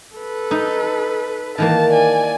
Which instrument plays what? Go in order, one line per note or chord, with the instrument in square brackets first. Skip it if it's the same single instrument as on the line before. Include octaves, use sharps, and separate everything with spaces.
[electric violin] A4 B4
[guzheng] D#4
[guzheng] D#3 E3 A#3 [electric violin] A5
[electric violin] D5 G#5